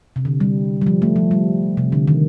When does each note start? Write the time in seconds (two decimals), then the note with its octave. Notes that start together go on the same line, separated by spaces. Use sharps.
0.16 C3
0.25 D3
0.40 G3
0.81 G3
0.87 F3
1.02 A3
1.16 F3
1.31 G3
1.77 C3
1.92 D3
2.08 D#3